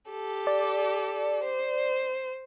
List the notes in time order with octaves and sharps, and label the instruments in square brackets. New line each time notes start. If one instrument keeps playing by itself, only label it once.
[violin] G4 A4
[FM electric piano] D5
[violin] C5